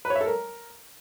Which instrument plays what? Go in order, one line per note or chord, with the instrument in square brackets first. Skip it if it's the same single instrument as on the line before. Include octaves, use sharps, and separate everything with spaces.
[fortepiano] B4
C#5
E5
A4
A#4